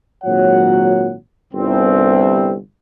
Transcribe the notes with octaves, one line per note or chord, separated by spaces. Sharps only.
G#1 A#2 F#3 C#5 F#5
G1 C2 C4